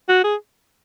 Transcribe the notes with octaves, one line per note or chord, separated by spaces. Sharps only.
F#4
G#4